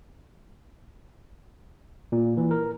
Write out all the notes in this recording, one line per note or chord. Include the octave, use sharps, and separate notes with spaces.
A#2
E3
A#4